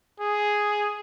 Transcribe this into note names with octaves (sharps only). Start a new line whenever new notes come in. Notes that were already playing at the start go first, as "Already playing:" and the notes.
G#4